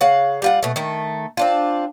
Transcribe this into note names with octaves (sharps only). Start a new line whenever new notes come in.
C#3 F5 F#5
G3 F4 F#5
B2 A3
D#3 A3
C4 D4 F4